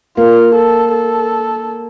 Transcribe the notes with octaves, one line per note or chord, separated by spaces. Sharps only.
A#3 F4
A4
A4